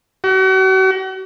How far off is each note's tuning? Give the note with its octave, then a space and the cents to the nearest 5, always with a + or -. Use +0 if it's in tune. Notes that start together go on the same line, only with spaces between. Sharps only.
F#4 +40